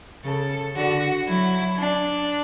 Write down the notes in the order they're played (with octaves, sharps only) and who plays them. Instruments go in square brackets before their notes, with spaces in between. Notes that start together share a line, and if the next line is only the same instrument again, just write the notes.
[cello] C#3 [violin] A4
[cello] D3 [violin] F#4
[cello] F#3 [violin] E4
[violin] D4